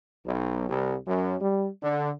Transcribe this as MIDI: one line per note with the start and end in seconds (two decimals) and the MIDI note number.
0.26 0.67 35
0.70 0.96 36
1.07 1.36 42
1.41 1.68 55
1.82 2.11 50